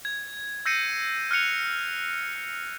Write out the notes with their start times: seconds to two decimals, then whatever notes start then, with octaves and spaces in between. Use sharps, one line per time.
0.05 G#6
0.66 E6 G6 A#6 C7 C#7 D#7
1.31 F6 F#6 C#7 F7